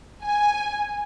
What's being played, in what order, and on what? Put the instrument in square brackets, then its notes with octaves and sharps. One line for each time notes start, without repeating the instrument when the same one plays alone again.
[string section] G#5